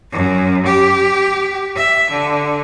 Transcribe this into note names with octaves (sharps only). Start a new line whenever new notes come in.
F#2
G4
E5
D3